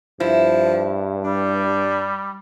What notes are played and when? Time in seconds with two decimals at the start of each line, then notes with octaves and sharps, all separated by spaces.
0.20 G2 F3 E4
1.24 G3 D4